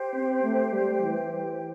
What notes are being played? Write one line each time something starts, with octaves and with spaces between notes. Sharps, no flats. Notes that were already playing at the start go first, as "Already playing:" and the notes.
Already playing: G4 C5 G5
C4
A3
G3
E3